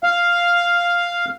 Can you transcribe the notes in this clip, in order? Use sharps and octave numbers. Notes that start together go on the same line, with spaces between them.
F5